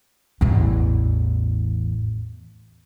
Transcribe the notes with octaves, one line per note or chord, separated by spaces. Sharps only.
A1 E2